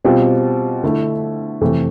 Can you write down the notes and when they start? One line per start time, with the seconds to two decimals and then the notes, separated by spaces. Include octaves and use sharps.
0.04 B2 G3 C4 F4
0.83 D3 A3 E4 A4
1.61 F2 C3 E3 A3 C4